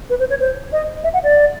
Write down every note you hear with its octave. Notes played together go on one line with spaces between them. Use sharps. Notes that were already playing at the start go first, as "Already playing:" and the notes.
B4
C5
C#5
C5
D#5
E5
F#5
D5